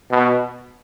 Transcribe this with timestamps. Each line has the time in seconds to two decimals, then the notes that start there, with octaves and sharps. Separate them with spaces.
0.11 B2